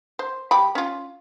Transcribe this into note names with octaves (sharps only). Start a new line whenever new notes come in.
C5
G3 G4 B5
C#4 F4